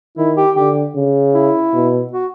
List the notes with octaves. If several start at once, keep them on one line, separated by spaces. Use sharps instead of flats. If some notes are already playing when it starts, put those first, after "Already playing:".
D#3 E4
G4
D3 G4
C#3
E4
B2
F#4